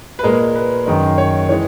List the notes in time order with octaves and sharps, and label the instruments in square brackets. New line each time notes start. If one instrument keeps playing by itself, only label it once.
[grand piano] B4
A#2 G#3 A#4
B4
F#2 D#3 G#3
C#5
E3 G#3 C#5